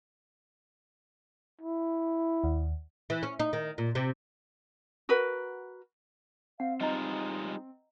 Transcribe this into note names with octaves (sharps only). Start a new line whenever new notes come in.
E4
D#2
E3
C#4
D#4
D#3
A#2
C3
F#4 A#4 B4
C4 F5 F#5
G3 G#3 D#4 F4 D#5 A#5